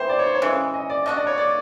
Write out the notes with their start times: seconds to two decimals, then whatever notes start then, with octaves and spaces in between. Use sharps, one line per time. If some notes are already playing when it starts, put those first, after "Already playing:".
Already playing: E3 G3 B3 C5
0.09 D5
0.19 C#5
0.26 C5
0.35 C#5
0.42 C#3 E3 G#3
0.74 D#5
0.90 D5
1.06 A3 D4 F#4 D#5
1.16 D5
1.27 C#5
1.38 D5